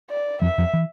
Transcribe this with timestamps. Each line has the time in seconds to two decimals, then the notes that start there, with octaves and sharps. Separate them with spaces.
0.10 D5
0.42 F2 F3 E5
0.58 F2 F3
0.73 E3